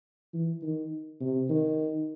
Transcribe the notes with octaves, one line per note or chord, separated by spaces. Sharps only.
E3
D#3
C3
D#3